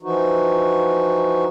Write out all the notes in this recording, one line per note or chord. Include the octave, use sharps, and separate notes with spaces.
E3 F3 D#4 F#4